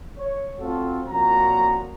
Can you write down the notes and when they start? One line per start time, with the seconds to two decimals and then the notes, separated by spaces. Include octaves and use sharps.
0.18 C#5
0.59 A3 C4 F4 F#4 A4
1.08 C2 A#2 F3 C#4 F#4 A#5